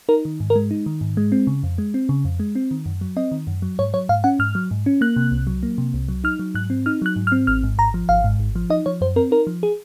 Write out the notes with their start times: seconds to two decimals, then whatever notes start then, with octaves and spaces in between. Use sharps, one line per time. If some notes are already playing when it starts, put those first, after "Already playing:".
0.09 D#4 A#4
0.25 D#3
0.40 G#2
0.50 A#4
0.56 G#3
0.71 D#4
0.86 D#3
1.01 G#2
1.17 G#3
1.32 C4
1.47 C#3
1.63 F2
1.78 G#3
1.94 C4
2.09 C#3
2.25 F2
2.40 G#3
2.55 C4
2.71 D#3
2.86 F#2
3.01 F#3
3.17 C4 D#5
3.32 D#3
3.47 F#2
3.62 F#3
3.79 G#2 C#5
3.94 F#3 C#5
4.09 G#2 F5
4.24 C#4 F#5
4.39 G#2 F6
4.55 F#3
4.71 G#2
4.86 C#4
5.01 A#3 F#6
5.16 C3
5.31 C2
5.47 F#3
5.63 A#3
5.78 C3
5.94 C2
6.08 F#3
6.24 D#4 F6
6.39 F#3
6.55 G#2 F#6
6.70 C4
6.86 D#4 F6
7.02 F#3 F#6
7.16 G#2
7.27 F6
7.32 C4
7.47 G#1 F6
7.63 G#2
7.78 G#1 A#5
7.94 F3
8.09 G#1 F5
8.24 G#2
8.39 G#1
8.55 F3
8.70 D#4 D#5
8.86 F3 C#5
9.01 F#2 C5
9.16 C4 A#4
9.31 D#4 A#4
9.47 F3
9.63 G#4